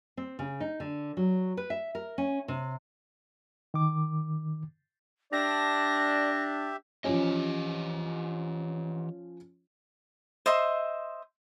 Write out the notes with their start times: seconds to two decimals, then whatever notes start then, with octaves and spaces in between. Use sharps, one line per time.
0.17 C4
0.39 C#3
0.60 D#4
0.80 D3
1.17 F#3
1.57 B4
1.70 E5
1.95 A#4
2.18 C#4
2.48 C3
3.74 D#3 D6
5.32 D4 G4 D5 E5 A#6
7.04 E3 F3 C#4 G4 D#5
10.46 C5 D#5 E5 C6